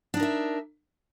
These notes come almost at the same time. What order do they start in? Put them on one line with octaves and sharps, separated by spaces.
D4 D#4 A#4 E5